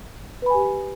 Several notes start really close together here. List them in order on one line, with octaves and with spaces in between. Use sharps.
B4 B5 G#5 G4